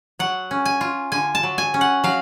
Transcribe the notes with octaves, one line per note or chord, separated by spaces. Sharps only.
F#3 F#5
C#4
G#5
F4
D3 G#5
A5
F#3
G#5
C#4
F#5
F#3 F5